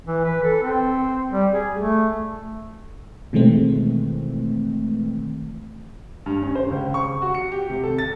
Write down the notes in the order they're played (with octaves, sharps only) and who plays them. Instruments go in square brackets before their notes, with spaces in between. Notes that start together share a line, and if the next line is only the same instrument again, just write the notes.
[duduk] E3
B4
A4
C4
G3
G#4
A3
[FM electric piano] B2 D#3 E3 G#3 A3 C4
[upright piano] G2
C#4
C5
C#2
C#6
F#4
C#7
G4
C3
A4
A6